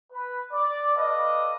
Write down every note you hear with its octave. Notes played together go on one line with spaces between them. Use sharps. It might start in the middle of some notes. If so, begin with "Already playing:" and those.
B4
D5
A4 B4 D5 D#5 F5